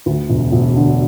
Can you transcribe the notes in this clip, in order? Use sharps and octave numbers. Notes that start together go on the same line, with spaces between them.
D2
E1
E1
D3